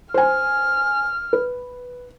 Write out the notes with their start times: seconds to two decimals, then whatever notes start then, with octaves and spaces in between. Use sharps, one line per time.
0.14 C5 G#5 F6
1.33 B4